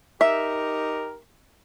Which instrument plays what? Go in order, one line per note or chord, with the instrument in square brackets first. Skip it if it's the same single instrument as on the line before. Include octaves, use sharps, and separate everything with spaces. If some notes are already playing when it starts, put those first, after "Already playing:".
[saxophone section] D#4 G4 A#4 [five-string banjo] E5